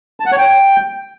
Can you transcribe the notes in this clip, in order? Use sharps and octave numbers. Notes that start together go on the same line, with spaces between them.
A5
F#5
C#5
G5